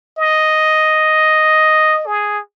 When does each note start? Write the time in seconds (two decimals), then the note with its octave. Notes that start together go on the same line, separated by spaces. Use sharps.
0.17 D#5
2.07 G#4